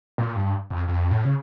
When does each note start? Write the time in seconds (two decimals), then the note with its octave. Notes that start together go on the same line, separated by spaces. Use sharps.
0.18 A#2
0.36 G2
0.70 F2
0.88 F2
1.11 A2
1.25 C#3